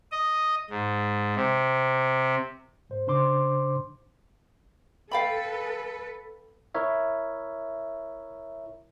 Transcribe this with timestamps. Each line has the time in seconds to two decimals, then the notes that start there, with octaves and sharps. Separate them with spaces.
0.12 D#5
0.70 G#2
1.36 C3
2.90 G#2 C5
3.07 C#3 D4 C5 C6 D6
5.11 A4 B4 F5 G5 B5
6.75 E4 A#4 C#5 E5